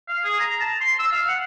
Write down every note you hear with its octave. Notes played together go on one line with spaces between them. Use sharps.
F5
G#4
A#5
A5
C6
E6
F5
F#5